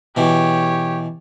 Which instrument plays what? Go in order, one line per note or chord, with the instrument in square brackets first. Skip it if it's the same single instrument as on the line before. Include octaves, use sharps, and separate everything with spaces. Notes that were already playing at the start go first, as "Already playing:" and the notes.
[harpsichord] B2 E3 [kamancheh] G4 C#5